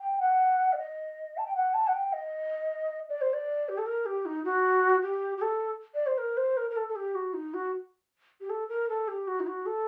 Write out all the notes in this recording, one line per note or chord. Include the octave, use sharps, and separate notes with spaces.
G5
F#5
D5
D#5
A5
G5
F#5
A5
F#5
G5
D#5
D5
C5
D5
G4
A4
A#4
G4
D#4
F#4
G4
G4
A4
D5
C5
A#4
C5
A#4
A#4
A4
A4
G4
F#4
D#4
F#4
G4
A4
A#4
A4
G4
F#4
D#4
F#4
A4